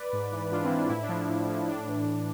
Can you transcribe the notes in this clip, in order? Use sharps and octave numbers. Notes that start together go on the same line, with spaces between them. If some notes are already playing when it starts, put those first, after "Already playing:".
Already playing: B4 D5
G#2
E3
G#2 D4 F4
C4 E4
E3
D4
A2 E4
D4
F3
A2
F3
A2 D4
E3
A2